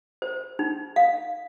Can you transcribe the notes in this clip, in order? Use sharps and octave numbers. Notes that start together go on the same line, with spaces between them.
C5
D#4
F5